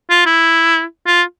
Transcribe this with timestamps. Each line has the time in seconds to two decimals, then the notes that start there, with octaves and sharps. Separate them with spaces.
0.10 F4
0.26 E4
1.07 F4